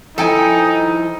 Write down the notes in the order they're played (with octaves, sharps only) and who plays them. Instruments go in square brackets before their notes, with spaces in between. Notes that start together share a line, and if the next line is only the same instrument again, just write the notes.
[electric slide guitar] F3 E4 [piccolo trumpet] D#4 [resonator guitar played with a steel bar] A4 G5 G#5